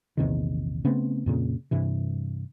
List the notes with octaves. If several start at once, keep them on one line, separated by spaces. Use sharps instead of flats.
A#1 E2 C3 D#3
C#3 A3 B3 C4
F2 A#2 C#3
G2 C3 E3